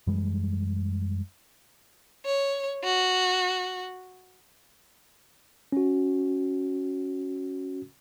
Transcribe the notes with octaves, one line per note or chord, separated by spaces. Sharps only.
F#2 E3 G3 G#3
C#5
F#4
C#4 F#4